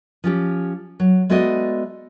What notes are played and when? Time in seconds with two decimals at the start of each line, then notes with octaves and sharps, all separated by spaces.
0.24 F3 C#4 G4
1.00 F#3
1.30 G#3 A3 B3 F#4 D5 D#5